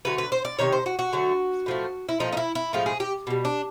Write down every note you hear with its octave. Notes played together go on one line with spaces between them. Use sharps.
D3 F#3 A3 B4
B4
C5
D5
C3 D#3 C#5
C5
F#4
F#4
D3 F#3 A3
A2 F3 A3
E4
A#2 F3 A3 D#4
D#4
E4
E4
A2 F3 G#3 F4
G#4
G4
B2 G3
D4